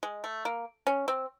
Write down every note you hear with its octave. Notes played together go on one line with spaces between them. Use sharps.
G#3
A3
A#3
C#4
C4